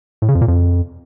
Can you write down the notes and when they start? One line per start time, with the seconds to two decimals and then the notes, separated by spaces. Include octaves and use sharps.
0.22 A2
0.28 C#3
0.35 F2
0.41 A#2
0.48 F2